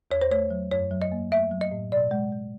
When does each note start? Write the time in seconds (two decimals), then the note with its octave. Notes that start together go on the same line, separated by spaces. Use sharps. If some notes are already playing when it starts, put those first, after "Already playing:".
0.11 E2 C#5
0.22 C5
0.31 A3 C#5
0.51 F#3
0.71 F#2 C#5
0.91 F#3
1.02 D#5
1.12 A#3
1.31 A3 E5
1.51 F#3
1.61 D#5
1.71 A2
1.92 B2 D5
2.11 G#3
2.32 G#3